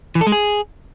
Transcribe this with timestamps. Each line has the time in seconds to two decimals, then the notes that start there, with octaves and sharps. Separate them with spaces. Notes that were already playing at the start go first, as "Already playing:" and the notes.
0.15 E3
0.21 A4
0.27 G#3
0.32 G#4